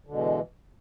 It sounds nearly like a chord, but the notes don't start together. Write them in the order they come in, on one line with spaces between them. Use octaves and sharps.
D3 B2 G#3 E3